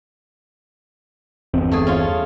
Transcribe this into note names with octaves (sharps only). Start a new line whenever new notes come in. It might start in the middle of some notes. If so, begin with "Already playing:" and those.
G1 E2 C4
A3 G#4
C#4 F4